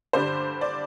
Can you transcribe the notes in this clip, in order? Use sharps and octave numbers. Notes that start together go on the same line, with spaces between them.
G2 D3 G3 D4 C5
D5